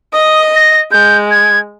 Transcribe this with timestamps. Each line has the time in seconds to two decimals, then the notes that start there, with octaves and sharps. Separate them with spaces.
0.13 D#5 D#6
0.55 A#6
0.92 G#3 G6
1.31 G#6